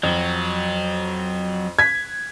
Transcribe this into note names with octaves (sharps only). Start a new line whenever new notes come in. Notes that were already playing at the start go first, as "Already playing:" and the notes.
F2 F#3
G#6 B6